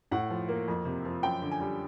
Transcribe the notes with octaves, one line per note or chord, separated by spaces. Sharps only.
A2 F#5
F3
A#3
F2
C3
F3
F#2 G5
D3
G#5
G3